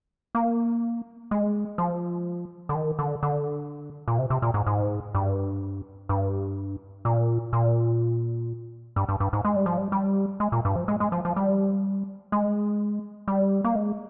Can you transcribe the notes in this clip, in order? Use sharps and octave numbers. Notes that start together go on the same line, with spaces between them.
A#3
G#3
F3
D3
D#3
D3
D3
A#2
C3
C3
A#2
G#2
G#2
G2
G2
A#2
A#2
G2
G2
G2
G#2
G#3
G3
F3
G3
G3
G#3
A#2
G2
F3
G#3
G#3
F3
F3
G3
G#3
G3
A#3
G#3